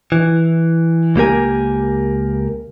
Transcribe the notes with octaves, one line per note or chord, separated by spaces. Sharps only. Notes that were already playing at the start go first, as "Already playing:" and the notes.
E3
C#2 A#3 G4 A#4 G#5